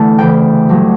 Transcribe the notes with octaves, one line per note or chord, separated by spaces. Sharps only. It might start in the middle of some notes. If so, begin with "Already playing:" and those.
Already playing: E2 D3 A3 A5
D2 C#3 E3 G5
G2 F#3 A3